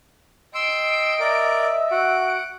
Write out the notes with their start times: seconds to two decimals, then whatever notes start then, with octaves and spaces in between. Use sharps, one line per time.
0.55 D#5 G5 C6 E6 D7
1.20 A#4 D5 E5
1.91 F#4 F#5 D7